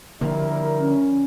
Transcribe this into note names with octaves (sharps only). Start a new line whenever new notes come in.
D3 F3 G3 A#3 E4 A#4
C#4